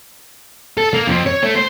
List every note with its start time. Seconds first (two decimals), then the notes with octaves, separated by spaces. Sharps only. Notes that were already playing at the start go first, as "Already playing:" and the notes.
0.77 A4
0.93 A#3
1.07 F2
1.26 C#5
1.43 A3
1.55 C5